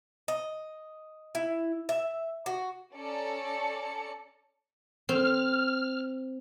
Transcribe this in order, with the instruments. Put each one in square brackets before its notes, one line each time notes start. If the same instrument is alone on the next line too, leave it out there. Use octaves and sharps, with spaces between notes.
[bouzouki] D#5
E4
E5
F#4
[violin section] C#4 A4 D5 A#5 C#7
[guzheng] C4 [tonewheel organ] F6